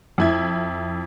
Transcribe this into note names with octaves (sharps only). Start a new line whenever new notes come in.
F2 E4 G#6